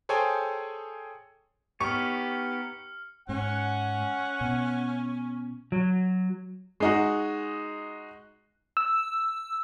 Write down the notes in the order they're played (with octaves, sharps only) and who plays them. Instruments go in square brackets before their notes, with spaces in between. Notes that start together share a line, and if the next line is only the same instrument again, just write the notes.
[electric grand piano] G#4 A4 C5 C#5 G5 G#5
[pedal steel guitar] B3 D#4 C#5 [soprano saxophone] G4 [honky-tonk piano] C#6 [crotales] F6 C#7
[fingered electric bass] G#2 [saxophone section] C#4 [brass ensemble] F#5
[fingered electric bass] B2
[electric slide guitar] F#3
[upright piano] G#3 D#4 F#4
[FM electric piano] E6